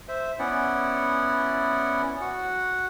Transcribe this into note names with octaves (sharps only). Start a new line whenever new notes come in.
C5 E5
B3 C#4 E4 D5 F#5
F#4 F#5